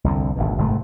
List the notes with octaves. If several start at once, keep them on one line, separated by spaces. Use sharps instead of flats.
C2 F2 D3
G#1 D2 B2
F#1 G#2 C3 A3